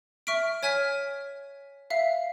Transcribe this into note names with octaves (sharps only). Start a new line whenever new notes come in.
E5 C#6 F6 B6 D7
C#5 G#5 F6 G#6 B6
E5 F5